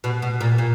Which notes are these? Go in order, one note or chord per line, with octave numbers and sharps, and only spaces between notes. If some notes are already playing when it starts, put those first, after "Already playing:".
B2
B2
A#2
A#2